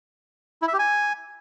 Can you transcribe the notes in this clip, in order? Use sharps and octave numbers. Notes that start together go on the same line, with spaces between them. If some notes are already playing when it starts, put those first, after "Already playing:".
E4
E5
G4
G#5